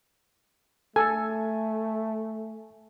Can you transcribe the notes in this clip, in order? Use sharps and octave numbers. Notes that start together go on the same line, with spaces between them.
A3 A4 G#5